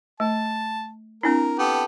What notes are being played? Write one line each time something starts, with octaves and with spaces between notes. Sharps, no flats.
A3 A5
C4 D4 E4 A#4
B3 G4 A4